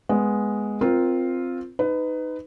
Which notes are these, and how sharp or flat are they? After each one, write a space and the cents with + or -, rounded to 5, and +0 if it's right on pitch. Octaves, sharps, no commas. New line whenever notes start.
G#3 +0 B3 +0
C4 +0 F4 +0 A#4 +15
D#4 +0 B4 +20